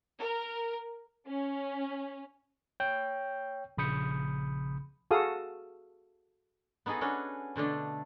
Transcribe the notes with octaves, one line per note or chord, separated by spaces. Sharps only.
A#4
C#4
C#5 G5 G6
A#1 C#3 B5 D#6 G6 C#7
F#4 G#4 A4 F5 D#6
B3 D#4 F#4 G#4 A4
B3 C#4 D4 F#4
B2 D3 A3 D4